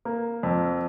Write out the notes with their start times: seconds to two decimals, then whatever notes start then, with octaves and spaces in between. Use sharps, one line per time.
0.05 A#3
0.43 F2